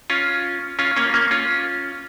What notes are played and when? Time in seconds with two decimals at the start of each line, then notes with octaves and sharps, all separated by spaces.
0.10 C#4 F4
0.79 C#4 F4
0.96 A#3 C#4
1.14 A#3 C#4
1.31 C#4 F4